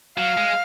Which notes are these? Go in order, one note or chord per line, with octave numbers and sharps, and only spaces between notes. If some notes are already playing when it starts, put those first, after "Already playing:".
F#3 F5
G#3